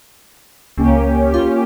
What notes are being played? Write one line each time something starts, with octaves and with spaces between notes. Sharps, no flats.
C#2 A#3 C#4 G4
F4